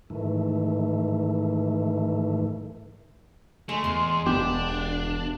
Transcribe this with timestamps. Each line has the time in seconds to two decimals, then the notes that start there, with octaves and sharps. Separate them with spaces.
0.10 G#2 D#3 E3 A3
3.69 G#3 A3
3.84 E2 C6
4.26 E1 B3 D4 G4